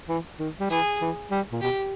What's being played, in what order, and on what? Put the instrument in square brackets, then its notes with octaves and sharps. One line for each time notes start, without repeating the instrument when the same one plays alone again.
[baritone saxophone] E3
D#3
G3
[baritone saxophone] E3 [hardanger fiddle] G#4
[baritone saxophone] E3
G3
A#2
[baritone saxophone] B2 [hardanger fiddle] G4